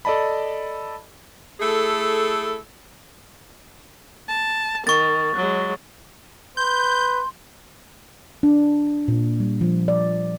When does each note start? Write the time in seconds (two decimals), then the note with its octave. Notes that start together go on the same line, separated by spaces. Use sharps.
0.05 A4 D5 D#5 A5 B5
1.60 A3 E4 G#4 A4
4.28 A5
4.87 D#3 C#6 A6
5.35 F#3 G#3
6.57 B4 C6 G6
8.43 D4
9.08 A#2
9.40 G3
9.61 F3
9.88 D5